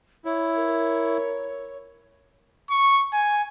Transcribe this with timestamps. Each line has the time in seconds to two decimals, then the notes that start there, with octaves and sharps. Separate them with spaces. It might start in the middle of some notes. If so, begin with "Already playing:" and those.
0.25 E4 C#5
0.56 A#4
2.70 C#6
3.13 G#5